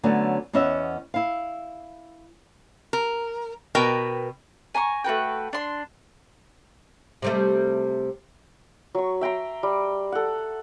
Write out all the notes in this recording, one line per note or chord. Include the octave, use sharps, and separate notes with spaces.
D3 F#3 A3 B3 C#4
E2 B3 C#4 D#5 E5
E4 F5
A#4
B2 A#4 B4 G5
G#5 A#5 C6 C#6
A3 F#4 B4 G5
D4 C6
C3 G3 A3
F#3 C#6
E5 G5 A#5 C6
G3
A4 F#5